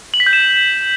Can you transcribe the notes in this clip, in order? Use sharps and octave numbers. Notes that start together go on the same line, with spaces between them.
F#7
B6
G6
E7